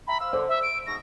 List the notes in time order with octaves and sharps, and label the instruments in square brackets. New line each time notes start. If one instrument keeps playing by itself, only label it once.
[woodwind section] E5 G5 A#5 [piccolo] B5
[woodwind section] C5 F5 [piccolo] E6
[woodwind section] D3 [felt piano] C5
[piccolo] E5 [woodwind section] E6
[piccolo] D7
[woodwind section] G#2 B2 [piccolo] A#6